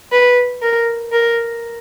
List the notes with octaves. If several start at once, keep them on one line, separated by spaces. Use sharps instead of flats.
B4
A#4
A#4